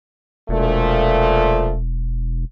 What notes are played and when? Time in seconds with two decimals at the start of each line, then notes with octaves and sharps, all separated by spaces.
0.49 E1 A#2 F3 A3